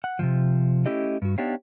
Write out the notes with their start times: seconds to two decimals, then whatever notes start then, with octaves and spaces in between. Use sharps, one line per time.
0.04 F#5
0.19 C3 D#3 F3
0.86 A3 C#4 E4 G4 D#5
1.22 G2 F#4
1.38 B3 D4 D#4 G4 C#5 F5